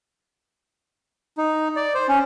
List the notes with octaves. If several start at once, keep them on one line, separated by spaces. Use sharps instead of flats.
D#4
D5
C5
C#4